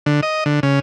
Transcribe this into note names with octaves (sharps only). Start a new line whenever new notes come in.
D3
D#5
D3
C#3